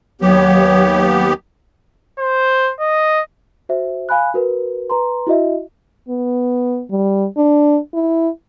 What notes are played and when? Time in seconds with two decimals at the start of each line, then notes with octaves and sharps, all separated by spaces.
0.21 D#2 F#3 B3 G4 C#5
2.19 C5
2.80 D#5
3.69 F#4 C5 E5
4.09 F5 G#5 B5 F#6
4.34 F#4 A#4 B4
4.90 B4 A#5 C6
5.27 E4 F#4 D#5 E5
6.09 B3
6.91 G3
7.37 D4
7.94 E4